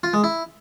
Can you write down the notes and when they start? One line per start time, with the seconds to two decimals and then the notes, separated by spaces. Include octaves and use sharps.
0.03 F4
0.14 G#3
0.24 E4